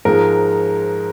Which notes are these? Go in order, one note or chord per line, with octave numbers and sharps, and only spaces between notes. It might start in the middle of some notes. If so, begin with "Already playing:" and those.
G#2 F3 G#3 A#4